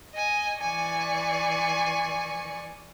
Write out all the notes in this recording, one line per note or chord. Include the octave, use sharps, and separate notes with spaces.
D#5 G#5
E3 D5 G#5 C#6